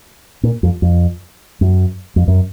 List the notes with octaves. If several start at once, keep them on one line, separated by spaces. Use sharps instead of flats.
A#2
F2
F2
F#2
F2
F#2